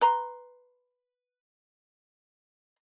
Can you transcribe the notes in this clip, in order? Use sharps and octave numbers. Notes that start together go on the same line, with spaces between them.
B4 A#5 C6